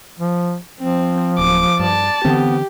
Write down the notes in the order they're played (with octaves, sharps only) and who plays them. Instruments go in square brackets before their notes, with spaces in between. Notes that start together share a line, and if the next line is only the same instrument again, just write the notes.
[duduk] F3
[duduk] F3 [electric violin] C4
[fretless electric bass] D1 [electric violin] D6
[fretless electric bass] G2 [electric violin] D5 A5
[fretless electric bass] D3 E3 C4 [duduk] B3 [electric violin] G4